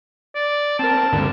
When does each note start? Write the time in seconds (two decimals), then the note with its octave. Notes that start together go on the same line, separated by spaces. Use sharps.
0.35 D5
0.79 C4 A#4 A5
1.13 D2 G2 D3